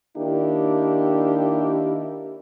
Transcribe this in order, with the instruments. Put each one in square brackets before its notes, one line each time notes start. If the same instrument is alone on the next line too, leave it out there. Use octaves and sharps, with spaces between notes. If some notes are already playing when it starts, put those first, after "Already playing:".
[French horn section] D#3 A#3 D4 E4 G4